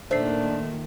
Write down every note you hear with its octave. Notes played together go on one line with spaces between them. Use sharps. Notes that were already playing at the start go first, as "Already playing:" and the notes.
A#2 D#3 A3 D4 C5 C7